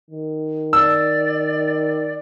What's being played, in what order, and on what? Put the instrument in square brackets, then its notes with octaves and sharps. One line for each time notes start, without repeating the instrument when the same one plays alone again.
[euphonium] D#3
[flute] D5 [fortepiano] E6